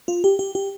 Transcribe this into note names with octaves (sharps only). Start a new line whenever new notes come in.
F4
G4
G4
G4